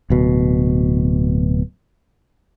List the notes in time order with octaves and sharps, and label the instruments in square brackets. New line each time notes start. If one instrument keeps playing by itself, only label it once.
[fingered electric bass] D1 B2